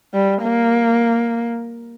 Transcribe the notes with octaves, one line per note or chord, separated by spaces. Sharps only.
G3
A#3